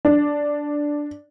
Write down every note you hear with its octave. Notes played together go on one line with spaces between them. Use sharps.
D4